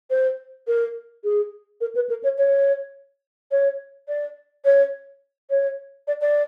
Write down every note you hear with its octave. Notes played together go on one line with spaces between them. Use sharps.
C5
A#4
G#4
A#4
B4
A#4
C#5
C#5
C#5
D5
C#5
C#5
D5
D5